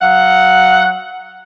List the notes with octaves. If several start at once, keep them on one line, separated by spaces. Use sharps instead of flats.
F#3 F5 F#5